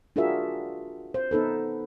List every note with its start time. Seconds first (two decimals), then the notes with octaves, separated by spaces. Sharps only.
0.16 D4 F4 F#4 G#4 A#4 E5
1.14 C5
1.31 B3 D#4 A4 B4